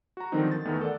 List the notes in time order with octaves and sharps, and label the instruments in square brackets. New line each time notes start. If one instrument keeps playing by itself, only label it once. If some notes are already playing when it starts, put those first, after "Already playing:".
[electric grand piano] F#4 A#5
D3 D#3 F3 F#3 C4 D#4
A6
E2 D#3 A3 B3
A4 A#4 D5 F#5